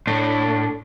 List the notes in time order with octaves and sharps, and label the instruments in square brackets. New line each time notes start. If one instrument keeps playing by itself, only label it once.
[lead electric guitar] A2 [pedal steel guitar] D4